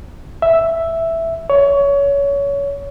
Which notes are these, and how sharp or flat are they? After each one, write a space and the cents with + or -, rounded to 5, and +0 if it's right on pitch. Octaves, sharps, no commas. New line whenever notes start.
E5 +0
C#5 +25